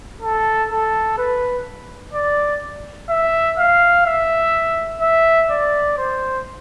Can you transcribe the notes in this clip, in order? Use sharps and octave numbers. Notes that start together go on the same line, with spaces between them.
A4
A4
B4
D5
E5
F5
E5
E5
D5
C5